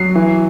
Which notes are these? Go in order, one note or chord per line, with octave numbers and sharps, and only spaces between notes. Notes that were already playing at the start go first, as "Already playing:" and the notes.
Already playing: F#3 C7
E3